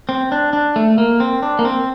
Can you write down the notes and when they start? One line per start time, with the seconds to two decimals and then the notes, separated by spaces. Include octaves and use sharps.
0.09 C4
0.32 D4
0.53 D4
0.76 A3
0.98 A#3
1.20 C4
1.43 D4
1.59 A#3
1.65 C4